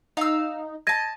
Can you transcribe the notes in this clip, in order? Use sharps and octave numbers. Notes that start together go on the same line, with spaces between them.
D#4 F5 E6
D#5 A5 G#6 A#6 D#7